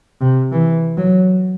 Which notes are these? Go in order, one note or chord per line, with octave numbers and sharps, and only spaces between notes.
C3
E3
F#3